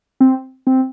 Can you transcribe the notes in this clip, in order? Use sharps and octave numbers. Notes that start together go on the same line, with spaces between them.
C4
C4